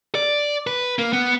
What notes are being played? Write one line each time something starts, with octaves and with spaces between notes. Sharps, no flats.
D5
B4
A#3
B3